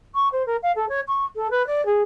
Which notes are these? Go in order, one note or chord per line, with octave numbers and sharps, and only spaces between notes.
C#6
C5
A#4
F5
A4
C#5
C#6
A4
B4
D5
G#4